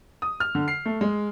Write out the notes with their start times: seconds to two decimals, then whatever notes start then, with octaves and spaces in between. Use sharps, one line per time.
0.22 D#6
0.40 F6
0.55 D3
0.68 C7
0.85 A3
1.01 G#3